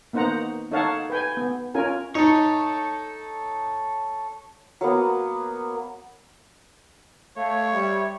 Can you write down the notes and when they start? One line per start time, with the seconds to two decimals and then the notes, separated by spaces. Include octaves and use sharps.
0.13 A#3 B3 D#4 C5 F#5 A#5
0.72 D#4 A4 C#5 F5 F#5 A5
1.10 B4 G5 G#5
1.37 B3
1.74 C#4 F4 A#4 G#5
2.15 D#4 A4 C#5
4.81 F#3 A#3 B3
7.37 A3 C#5 F5
7.73 G3 E5